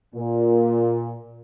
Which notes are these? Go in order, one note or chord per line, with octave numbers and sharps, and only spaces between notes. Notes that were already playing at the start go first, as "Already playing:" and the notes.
A#2